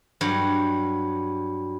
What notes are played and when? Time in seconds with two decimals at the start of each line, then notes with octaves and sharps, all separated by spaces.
0.21 G2 F#3